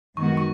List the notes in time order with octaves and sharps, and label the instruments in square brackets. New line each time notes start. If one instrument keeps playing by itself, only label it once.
[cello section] F#2 D#3 G#3 B3 F#4 [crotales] C#6
[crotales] C#6